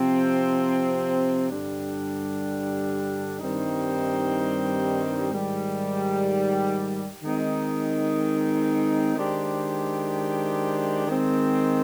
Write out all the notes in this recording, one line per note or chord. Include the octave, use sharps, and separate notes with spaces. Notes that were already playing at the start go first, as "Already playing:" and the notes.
Already playing: C3 F3 C4
G2 D3 G3 D4
G2 D#3 G3 C4 D#4
G#2 D#3 G3
D#3 G#3 C4 D#4
D#3 G#3 D4 G4 C5
D#3 G#3 C4